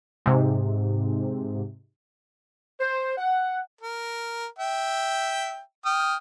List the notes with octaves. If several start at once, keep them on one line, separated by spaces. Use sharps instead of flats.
G#2 C3
C5
F#5
A#4
E5 G5
G5 D#6 F6